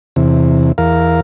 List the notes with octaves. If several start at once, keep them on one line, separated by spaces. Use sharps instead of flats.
E2 C3
E2 A#4 F5